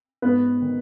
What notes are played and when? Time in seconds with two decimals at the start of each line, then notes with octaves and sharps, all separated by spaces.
0.22 G#2 B3 B4
0.62 D#3